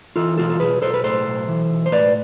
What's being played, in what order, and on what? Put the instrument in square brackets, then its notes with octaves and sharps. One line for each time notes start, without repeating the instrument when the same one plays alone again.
[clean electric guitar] E3 F4 A4
B1 F4 A4
A4
B1 G#4 B4
B1 A4 C5
B4
A2 A4 C5
B1
E3
B1
C5
A2 B4 D5